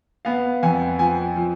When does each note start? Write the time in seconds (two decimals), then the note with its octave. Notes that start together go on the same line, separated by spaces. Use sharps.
0.25 B3 F5
0.63 F2 G#5
0.99 F3 G#5
1.36 F3